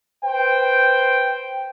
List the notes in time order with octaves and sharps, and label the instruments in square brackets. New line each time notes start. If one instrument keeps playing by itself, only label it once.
[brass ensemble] B4 C5 G5